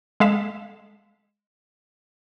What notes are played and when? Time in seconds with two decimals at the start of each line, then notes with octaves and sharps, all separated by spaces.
0.20 G#3 A4 F5 B6 E7